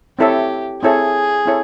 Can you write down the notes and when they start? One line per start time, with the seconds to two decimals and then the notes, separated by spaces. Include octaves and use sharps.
0.19 C4 E4 G4 A4 C#5 E5
0.82 C4 E4 G#4 A4 C#5 E5
1.46 C4 E4 A4 C#5